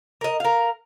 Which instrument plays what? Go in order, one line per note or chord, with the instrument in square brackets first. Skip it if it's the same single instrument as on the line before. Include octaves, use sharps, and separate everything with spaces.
[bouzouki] A#4 D#5
A#4 F5